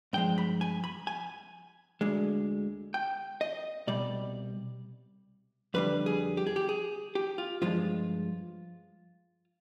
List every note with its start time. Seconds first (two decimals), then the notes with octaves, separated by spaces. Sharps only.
0.13 G2 F3 G#3 G5
0.38 B5
0.61 G#5
0.84 B5
1.07 G#5
2.01 D2 D3 G#3
2.94 G5
3.41 D#5
3.87 C2 B2 G3 D5
5.74 F2 D3 G3 B4
6.06 G#4
6.37 G4
6.47 G#4
6.56 G4
6.69 G#4
7.15 G4
7.38 F4
7.62 G2 F3 G#3 F4